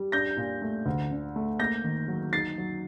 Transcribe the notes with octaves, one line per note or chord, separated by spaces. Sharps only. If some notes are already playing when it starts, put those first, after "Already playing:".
Already playing: G3
D4 G6 A#6
A#2
A3
D2
D3
A3
A#3 G6 A#6
D#3
F#3
D#4 A6 C7
F#3